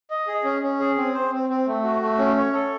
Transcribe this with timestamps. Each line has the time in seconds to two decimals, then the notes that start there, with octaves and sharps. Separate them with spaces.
0.11 D#5
0.27 G#4
0.44 C#4
0.62 C#4
0.80 G#4
0.97 C4
1.14 C5
1.32 C4
1.49 C4
1.67 A3
1.84 F#4
2.02 A3
2.19 C#4
2.37 C#5
2.53 A4